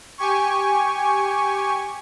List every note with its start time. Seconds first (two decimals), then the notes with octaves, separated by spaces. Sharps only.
0.18 G4 G#5 C#6